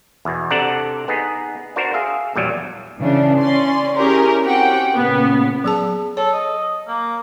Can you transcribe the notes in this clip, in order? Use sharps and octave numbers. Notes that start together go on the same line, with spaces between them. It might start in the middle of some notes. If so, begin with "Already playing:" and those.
E2 B2
C3 D4 A4 D5 F#5 A#5
B3 D#4 G#4
D4 F#4 A#4 C5
G#4 E5 F5
A#1 E2 F#3 G3
C#3 E3 D4
C#4 D5 C6
C#4 E4 G4 G#4 A#4
C4 C#4 F#4 G4 F#5 G5
A#2 C#3 B3
F#3 G#4 A5
A4 C#5
D#5
A#3